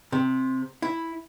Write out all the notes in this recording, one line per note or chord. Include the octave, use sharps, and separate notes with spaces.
C3
E4